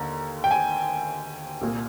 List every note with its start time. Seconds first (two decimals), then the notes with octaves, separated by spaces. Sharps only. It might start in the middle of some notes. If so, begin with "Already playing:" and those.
Already playing: D#2 D3 A#5
0.44 G5
0.51 G#5
1.61 C2 A#2